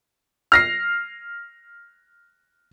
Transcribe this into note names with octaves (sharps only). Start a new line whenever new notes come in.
F6 A#6 C7